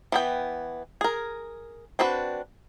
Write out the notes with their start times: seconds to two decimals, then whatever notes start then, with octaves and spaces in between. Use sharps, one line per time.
0.12 E3 B3 G5
1.01 G#4 A#4
1.99 C4 D4 F#4 B4